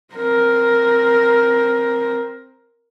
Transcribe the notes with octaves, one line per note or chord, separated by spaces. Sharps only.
C4 A#4